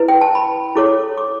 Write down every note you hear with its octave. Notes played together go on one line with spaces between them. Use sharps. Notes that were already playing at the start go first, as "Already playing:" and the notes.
Already playing: E4 B4
G5
A5
B5
E4 A4 C#5 D6
D6